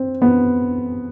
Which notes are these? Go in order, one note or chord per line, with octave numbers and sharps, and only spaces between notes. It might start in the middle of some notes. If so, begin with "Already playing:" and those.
Already playing: C4
B3